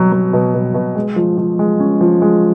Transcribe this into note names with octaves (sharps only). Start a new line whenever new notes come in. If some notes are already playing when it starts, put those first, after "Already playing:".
Already playing: B2 F#3
F#3
B2
B2
B2
G#3
F3
F3
G#3
C#4
F3
G#3